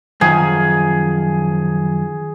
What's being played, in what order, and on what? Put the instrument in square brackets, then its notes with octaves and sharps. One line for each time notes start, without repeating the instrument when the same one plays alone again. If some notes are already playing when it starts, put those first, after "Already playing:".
[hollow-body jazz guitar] F#2 D#3 F3 [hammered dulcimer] G#4